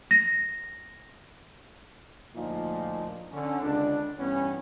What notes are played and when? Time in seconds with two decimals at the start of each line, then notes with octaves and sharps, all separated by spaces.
0.11 A#6
2.34 D2 A#2 F3 A#3 D#4
3.32 D3 C#4
3.62 C#2 D3 D4
4.18 G2 E3 B3 C#4